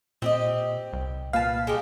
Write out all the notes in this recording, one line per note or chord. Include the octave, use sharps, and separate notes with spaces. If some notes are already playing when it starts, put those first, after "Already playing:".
A#2 C4 G4 D#5
C2
A#2 B4 F5 A5
G#3 D#4 G4